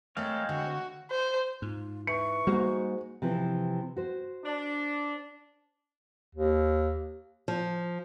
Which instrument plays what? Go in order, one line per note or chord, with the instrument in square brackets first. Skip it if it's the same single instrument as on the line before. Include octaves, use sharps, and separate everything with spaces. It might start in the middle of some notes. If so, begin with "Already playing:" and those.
[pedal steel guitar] G#3 C4 F5 [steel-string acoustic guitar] A3 A4 A#4 [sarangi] C#5
[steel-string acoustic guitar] D3 [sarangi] F#4
[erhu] C5
[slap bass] G#2 [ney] F4
[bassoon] E3 [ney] C#6 [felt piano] C#7
[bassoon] G#2 [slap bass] G3 A#3 [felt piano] F#4
[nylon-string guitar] C3 E3 F3
F#4 C5
[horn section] D4
[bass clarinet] D#2
[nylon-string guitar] F3